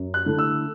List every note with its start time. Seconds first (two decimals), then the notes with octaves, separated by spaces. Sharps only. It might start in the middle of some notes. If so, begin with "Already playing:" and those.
Already playing: F#2
0.14 F#6
0.26 D3 A3 E4
0.39 E6